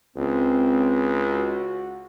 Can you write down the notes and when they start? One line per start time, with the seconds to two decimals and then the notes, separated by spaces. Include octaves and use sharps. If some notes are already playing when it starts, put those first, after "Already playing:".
0.16 C#2 C4
1.31 F#4